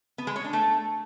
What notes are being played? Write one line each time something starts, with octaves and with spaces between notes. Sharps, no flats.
B3
G#3
C#5
D4
A3